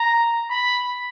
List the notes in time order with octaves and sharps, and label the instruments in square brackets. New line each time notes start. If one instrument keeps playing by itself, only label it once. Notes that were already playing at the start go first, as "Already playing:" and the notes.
Already playing: [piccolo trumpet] A#5
B5